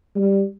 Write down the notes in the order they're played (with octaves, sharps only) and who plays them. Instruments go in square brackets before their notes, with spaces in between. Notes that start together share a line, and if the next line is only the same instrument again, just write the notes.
[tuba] G3